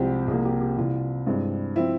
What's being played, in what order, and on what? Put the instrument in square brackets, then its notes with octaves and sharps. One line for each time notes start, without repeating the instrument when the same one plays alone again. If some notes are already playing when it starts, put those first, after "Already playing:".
Already playing: [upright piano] C2 C3 F3 G#3 C4 G4
C2 C3 F3 A#3 G#4
G4
G4
C2 C3 E3 F4
G2 E3 G#3 C4
F3 C4 E4